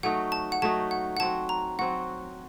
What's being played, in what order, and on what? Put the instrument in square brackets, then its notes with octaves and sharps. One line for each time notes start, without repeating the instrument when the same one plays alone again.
[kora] F#3 A3 D#4 F#4 [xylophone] F#5
[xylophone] A5
F#5
[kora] F#3 A3 D#4 F#4 [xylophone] A5
[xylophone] F#5
F#5
[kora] F#3 C4 F#4 [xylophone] A5
[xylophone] A#5
[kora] F#3 C4 F#4 [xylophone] F#5